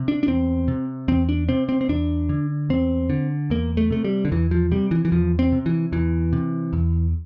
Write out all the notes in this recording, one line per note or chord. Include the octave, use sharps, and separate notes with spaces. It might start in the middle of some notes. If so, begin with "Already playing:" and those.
Already playing: C3
D4
D4
E2 C4
C3
E2 C4
D4
C3 C4
C4
C4
E2 D4
D3
E2 C4
D3
E2 A#3
A3
C3 A3
G3
D3
E2 E3
F3
C3 G3
E3
E3
E2 F3
C4
C3
E3
E2 E3
C3
E2